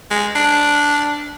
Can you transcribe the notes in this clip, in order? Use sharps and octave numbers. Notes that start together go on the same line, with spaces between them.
G#3
D4